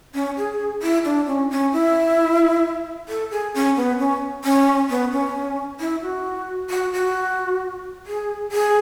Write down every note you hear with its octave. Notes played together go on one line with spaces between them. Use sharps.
C#4
G#4
E4
D4
C#4
C#4
E4
A4
G#4
C#4
B3
C#4
C#4
B3
C#4
E4
F#4
F#4
F#4
G#4
G#4